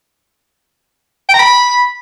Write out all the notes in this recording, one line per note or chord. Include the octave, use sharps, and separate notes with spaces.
G5
A#5
B5